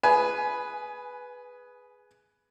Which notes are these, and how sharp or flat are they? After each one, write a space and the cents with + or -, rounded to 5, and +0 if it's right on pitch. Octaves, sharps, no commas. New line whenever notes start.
G#4 +0 B4 +0 G#5 +25